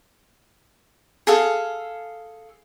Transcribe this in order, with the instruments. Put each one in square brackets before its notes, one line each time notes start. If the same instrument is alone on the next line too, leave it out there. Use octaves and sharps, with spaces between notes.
[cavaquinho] G#4 A4 F5